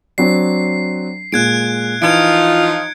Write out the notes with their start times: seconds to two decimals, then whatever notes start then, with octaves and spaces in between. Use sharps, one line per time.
0.18 F#3 C4 D4 C7
1.32 A#2 G#3 F#6 G#6 D7
2.02 E3 F3 D#4 F4 G#6 C#7 D7